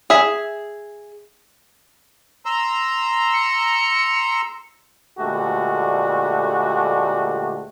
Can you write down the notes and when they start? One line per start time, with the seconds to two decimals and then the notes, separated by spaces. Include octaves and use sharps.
0.10 G#4 E5
2.46 A#5 C6 E6
3.33 C#7
5.19 D2 A#2 G#3 A3 F#4 G4